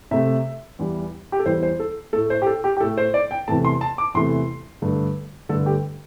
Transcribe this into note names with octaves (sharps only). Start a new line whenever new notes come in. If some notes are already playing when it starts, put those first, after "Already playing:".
C3 A3 E5
E2 E3 G3
G4
A4
E2 E3 G3 C5
C5
A4
A2 A3 A4
C5
G4
A4
G4
G4
A2 A3 A4
C5
D5
G5
E2 C3 E3 A3 A5
C6
A5
D6
E2 C3 E3 A3 C6
G2 D3 A3
G2 D3 A3 A4
G4